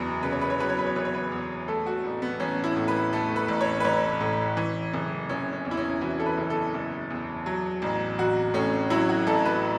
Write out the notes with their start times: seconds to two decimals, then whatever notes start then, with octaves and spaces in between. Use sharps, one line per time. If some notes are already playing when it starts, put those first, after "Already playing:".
Already playing: F#1 E2 F#3 B4
0.23 C#3 B4
0.32 C#5
0.41 B4
0.50 C#5
0.60 F#3 B4
0.69 C#5
0.78 B4
0.86 C#5
0.96 F#1 B4
1.05 C#5
1.14 B4
1.32 E2
1.68 A3 A4
1.86 F#4
2.05 A1
2.22 B3
2.40 A1 C#4
2.64 E4
2.76 A2
2.88 B4
3.13 A3 A4
3.36 B4
3.48 A1
3.61 C#5
3.80 B4
3.84 A1 C#5
4.21 A2
4.57 E3
4.93 F#1
5.29 F#1 C#4
5.53 C#4
5.65 E2
5.71 E4
5.77 C#4
5.90 E4
6.01 E3 F#4
6.19 A4
6.26 B4
6.37 F#1
6.50 A4
6.74 F#1
7.10 E2
7.46 F#3
7.82 A1
8.19 A1 F#4
8.54 A2 C#4
8.90 F#3 E4
9.09 F#4
9.27 A1 A4
9.45 B4